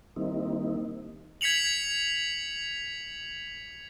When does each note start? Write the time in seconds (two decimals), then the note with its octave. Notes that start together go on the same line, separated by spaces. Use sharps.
0.16 D#3 G3 A#3 C4 D#4 E4
1.41 G#6 B6 C#7 F7 F#7